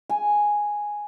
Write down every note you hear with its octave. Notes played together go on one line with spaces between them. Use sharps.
G#5